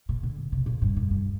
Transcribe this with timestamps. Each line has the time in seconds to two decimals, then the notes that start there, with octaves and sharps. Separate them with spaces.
0.09 A#2
0.23 D3
0.52 C3
0.66 A#2
0.82 G2
0.96 F2
1.11 G2